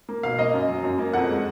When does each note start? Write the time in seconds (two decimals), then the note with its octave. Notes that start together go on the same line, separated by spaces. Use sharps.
0.09 A#3
0.23 B2 F5
0.39 A#3 D#5
0.54 F#2
0.68 F#3
0.84 F#2
0.98 A#3
1.13 F2 F#5
1.29 G#3